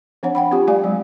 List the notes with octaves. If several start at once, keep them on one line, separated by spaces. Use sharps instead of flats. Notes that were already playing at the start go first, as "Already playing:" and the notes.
F3 C4 D4 C#5 F#5
F#5 G5 B5
C4 F4 G4
G3 A3 G4 D5 F5 G#5
F#3 G#3